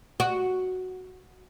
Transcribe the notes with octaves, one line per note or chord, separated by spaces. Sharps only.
F#4